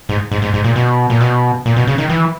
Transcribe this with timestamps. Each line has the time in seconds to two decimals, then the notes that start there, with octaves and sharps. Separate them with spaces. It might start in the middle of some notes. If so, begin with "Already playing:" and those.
0.09 G#2
0.31 G#2
0.42 G#2
0.54 G#2
0.64 A#2
0.76 B2
1.10 A#2
1.21 B2
1.66 A#2
1.76 B2
1.87 C#3
1.98 D#3
2.10 E3